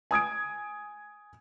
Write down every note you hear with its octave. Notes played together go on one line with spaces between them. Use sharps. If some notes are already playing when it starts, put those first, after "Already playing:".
G#5 D#6 G#6 D7